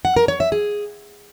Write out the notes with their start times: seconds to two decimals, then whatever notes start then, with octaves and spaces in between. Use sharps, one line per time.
0.05 F#5
0.16 A#4
0.28 C#5
0.40 E5
0.52 G#4